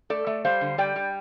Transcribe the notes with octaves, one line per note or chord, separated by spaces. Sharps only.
A3 A4 D5
A3
G3 C5 F5
D3
G3 D5 G5
G3